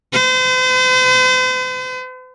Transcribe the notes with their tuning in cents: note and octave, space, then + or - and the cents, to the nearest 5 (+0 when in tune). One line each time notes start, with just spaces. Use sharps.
C5 -45